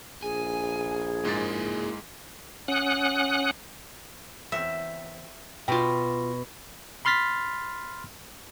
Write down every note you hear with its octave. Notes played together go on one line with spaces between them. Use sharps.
A#1 G#4 G#5
G#2 G#3 A#3 E4 A#4 A6
C#4 F#5 D#6 F#6
E2 C4 E5
B2 F4 G5
B5 C6 F6 A6 B6